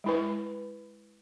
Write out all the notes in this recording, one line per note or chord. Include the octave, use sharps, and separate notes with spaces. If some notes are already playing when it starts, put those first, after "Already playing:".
G#3 E4 B4